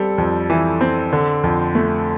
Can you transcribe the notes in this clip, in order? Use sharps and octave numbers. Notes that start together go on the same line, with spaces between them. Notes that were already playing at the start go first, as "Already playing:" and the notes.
Already playing: G3 C4 A4
F2
E3
C4
D3
F2
A3